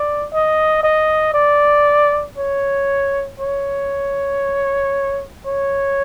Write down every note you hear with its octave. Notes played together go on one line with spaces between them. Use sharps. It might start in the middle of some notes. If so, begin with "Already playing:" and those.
Already playing: D5
D#5
D#5
D5
C#5
C#5
C#5